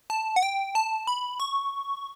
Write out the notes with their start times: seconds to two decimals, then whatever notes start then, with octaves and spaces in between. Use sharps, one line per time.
0.10 A5
0.36 F#5
0.42 G5
0.75 A5
1.07 B5
1.40 C#6